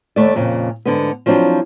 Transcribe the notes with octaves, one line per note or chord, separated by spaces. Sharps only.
D#2 A3 D5
F2 A#2 C#3
G#2 D3 B3
F3 F#3 C4 D4 E4 F4